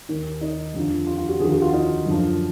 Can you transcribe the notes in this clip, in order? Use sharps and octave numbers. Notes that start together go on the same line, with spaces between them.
D#2 D#3
D#4
F2 D3 F3
F4
F4
F#4
D#2 D3 F3 G#4
F#4
F4
D#4
F#2 D3 F3